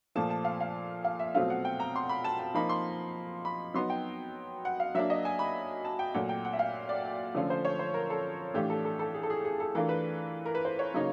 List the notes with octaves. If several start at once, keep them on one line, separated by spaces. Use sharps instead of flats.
A#2 F3 A3 A5
A5
F5
F5
F5
E5
B2 F#3 A3 C4 F4 F5
F#5
G5
A#5
C6
B5
A5
A5
F3 A#3 D#4 B5
C6
B5
F#3 B3 D#4 C6
G5
F#5
F5
F#3 A#3 D4 E5
D#5
G#5
B5
A5
G5
A#2 F#3 A3 F#5
G5
F#5
E5
F5
D5
D3 F3 A3 C#4 F4
C5
C#5
C5
A#4
A4
A2 E3 A3 D4 F4 G4
A4
A4
A4
G#4
A4
G#4
G#4
A4
E3 A3 D4 F4 A#4
B4
A#4
B4
C5
C#5
C#3 F#3 A#3 D#4